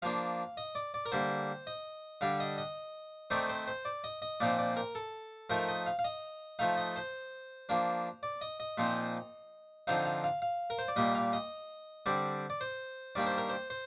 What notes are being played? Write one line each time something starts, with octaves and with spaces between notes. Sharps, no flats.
F3 A#3 D4 F5
D#5
D5
D5
A#4
D3 G3 A#3 C5
D#5
D3 G3 D4 F5
D#5
D#5
D#3 A3 C4 D#4 D5
C5
C5
D5
D#5
D#5
A#2 F3 C4 D#4 D5
D5
A#4
A4
F3 A3 D#4 A#4
D#5
F5
F5
D#5
F3 A3 D#4 F5
D#5
C5
F3 A#3 D4
D5
D#5
D#5
A#2 F3 C4 D#4
D3 F3 C4 D#4 F5
F5
F5
F5
A#4
C5
D5
A#2 G3 A#3 D#5
F5
D#5
D3 G3 C4 D5
D5
C5
D#3 G3 A#3 D4 D5
C5
A#4
C5
C5